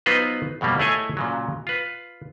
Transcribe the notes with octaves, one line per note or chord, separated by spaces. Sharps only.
F#3 B3 D#4 F4 B4 C5
F2 B2 F#3 G3 A#3
A3 E4 G#4 C#5 D#5 G#5
A#2 C#3 F#3
F4 B4